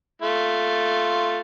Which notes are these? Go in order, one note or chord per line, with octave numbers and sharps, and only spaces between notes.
A3 F4